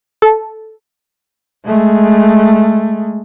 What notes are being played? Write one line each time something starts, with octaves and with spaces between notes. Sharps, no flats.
A4
G#3 A3